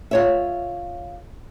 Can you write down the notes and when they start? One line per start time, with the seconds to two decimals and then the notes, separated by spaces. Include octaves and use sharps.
0.11 F4 C#5 E5